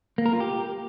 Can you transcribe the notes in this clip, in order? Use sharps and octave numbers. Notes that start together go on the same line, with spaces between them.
A#3
A#4
F4
G4